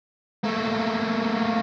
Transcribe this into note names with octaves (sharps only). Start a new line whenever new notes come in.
A3 A#3